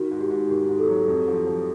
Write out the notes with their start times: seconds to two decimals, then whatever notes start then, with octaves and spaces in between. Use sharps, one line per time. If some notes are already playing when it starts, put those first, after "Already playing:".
Already playing: D#3 F#4
0.12 G#2
0.21 G4
0.30 G#2
0.49 D#3 G4
0.65 G#2 G4
0.78 A4
0.88 F#3
1.08 F2
1.28 F3
1.47 F3